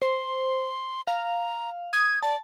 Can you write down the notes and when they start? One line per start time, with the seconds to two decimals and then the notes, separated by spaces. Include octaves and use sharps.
0.02 C5 C6
1.07 F5 A#5
1.93 D#6 G#6
2.23 D5 A5